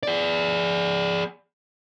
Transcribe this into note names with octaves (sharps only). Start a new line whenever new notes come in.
G#4 D5